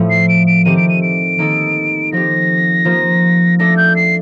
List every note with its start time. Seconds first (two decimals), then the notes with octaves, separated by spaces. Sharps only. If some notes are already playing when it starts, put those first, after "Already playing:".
Already playing: A2 F3 A3
0.10 C7
0.29 D7
0.47 D7
0.65 D#3 A3 C4 G4 D#7
0.77 D7
0.89 D#7
1.02 D7
1.39 D#3 A#3 D#4 A4
2.12 F3 C4 G4 A#6
2.85 F3 A#3 F4 C5
3.59 A3 D4 A4 A#6
3.77 G6
3.96 C7